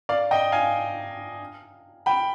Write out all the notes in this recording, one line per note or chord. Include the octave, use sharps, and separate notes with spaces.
D5 F5
D#5 G5
F5 G#5
G5 B5